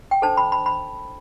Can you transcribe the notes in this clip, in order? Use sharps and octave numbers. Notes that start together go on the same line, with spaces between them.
G5
D4 A4 C5 A5
B5
B5
B5